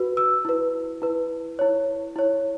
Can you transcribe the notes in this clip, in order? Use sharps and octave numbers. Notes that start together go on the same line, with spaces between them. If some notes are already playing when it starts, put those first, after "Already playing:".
Already playing: F#4 B4
E6
E4 B4
E4 B4
E4 C#5
E4 C#5